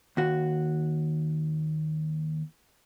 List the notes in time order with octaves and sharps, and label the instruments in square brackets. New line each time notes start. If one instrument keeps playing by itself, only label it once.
[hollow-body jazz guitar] D#2 F#4